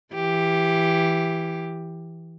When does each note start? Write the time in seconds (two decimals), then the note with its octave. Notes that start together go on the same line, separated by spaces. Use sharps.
0.14 E3 G4